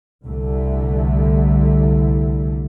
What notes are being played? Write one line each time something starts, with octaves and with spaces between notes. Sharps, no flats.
C2 D3 A3